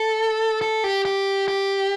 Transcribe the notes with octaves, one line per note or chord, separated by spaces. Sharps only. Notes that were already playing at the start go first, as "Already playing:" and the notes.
Already playing: A4
A4
G4
G4
G4